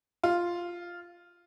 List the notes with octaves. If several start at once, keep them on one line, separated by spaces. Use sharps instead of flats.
F4